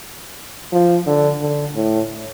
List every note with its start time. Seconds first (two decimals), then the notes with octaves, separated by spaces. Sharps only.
0.72 F3
1.06 D3
1.41 D3
1.76 A2